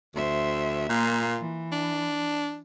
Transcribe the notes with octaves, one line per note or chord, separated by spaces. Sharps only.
D2 C5 E5
A#2 A#3 F4
E3
D4